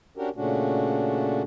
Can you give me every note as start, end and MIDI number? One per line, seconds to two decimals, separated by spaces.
0.17 0.29 61
0.17 0.29 62
0.17 0.29 66
0.17 0.29 67
0.17 0.29 70
0.36 1.42 46
0.36 1.42 49
0.36 1.42 57
0.36 1.42 61
0.36 1.42 62
0.36 1.42 66